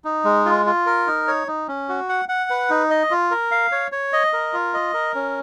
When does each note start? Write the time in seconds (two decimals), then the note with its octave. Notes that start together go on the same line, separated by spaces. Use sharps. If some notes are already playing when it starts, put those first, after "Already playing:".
0.04 D#4
0.25 G#3
0.46 F4
0.66 F4
0.86 A#4
1.07 D#4
1.28 C#5
1.47 D#4
1.68 C#4
1.89 F#4
2.09 F#5
2.29 F#5
2.50 B4
2.70 D#4
2.90 D#5
3.11 F4
3.31 A#4
3.51 F5
3.72 C#5
3.92 C#5
4.13 D#5
4.33 A#4
4.53 F4
4.74 D#5
4.94 A#4
5.15 C#4